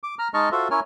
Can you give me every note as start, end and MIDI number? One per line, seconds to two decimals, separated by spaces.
0.03 0.15 86
0.19 0.28 82
0.19 0.28 89
0.34 0.49 56
0.34 0.49 63
0.34 0.49 75
0.34 0.49 81
0.34 0.49 85
0.34 0.49 89
0.52 0.68 65
0.52 0.68 66
0.52 0.68 69
0.52 0.68 72
0.52 0.68 76
0.71 0.80 61
0.71 0.80 64
0.71 0.80 70
0.71 0.80 73
0.71 0.80 80
0.71 0.80 89